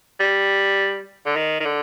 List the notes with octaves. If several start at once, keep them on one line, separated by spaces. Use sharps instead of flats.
G3
D3
D#3
D#3
D3